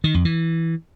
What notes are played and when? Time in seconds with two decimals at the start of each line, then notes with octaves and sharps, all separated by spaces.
0.04 D#3
0.14 F2
0.25 E3